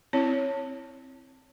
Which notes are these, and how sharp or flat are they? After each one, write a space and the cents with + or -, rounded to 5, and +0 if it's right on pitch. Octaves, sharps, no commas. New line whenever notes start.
C4 +0 E4 +0 C#5 +0